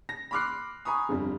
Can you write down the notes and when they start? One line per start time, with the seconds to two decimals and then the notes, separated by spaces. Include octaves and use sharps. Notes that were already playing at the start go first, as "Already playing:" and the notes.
0.09 A#6
0.31 B5 C6 D6 F6 F#6 C7
0.85 G#5 A#5 B5 C#6 D#6
1.09 G1 F2 G3